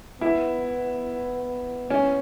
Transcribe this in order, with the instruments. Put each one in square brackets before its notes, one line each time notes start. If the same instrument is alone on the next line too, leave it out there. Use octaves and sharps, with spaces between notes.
[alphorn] B3 [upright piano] E4
[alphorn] B3 [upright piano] C#4